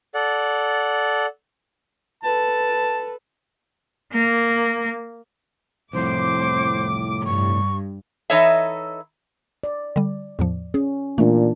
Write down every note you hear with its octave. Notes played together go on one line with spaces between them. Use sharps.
A4 D5 F#5
A4 B4 A5
A#3
C2 F2 A2 C5 D6
G2 C#6
E3 D#4 A4 C#5 D#5 E5
D5
D3 G3
E2 A2 F3
C#4 G#4
A#2 E3 A3 D4